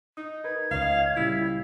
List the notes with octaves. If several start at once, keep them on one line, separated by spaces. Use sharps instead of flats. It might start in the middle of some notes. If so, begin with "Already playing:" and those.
D#4 D#6
A#4 B4 G#6
C#2 C#5 D#5 F5
A#2 C#3 G3 E4